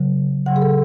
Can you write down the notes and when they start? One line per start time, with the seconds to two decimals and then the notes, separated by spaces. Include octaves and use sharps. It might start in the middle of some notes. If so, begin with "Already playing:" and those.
Already playing: C#3 F#3
0.46 C#3 F#3 F#5
0.56 G#4
0.62 A4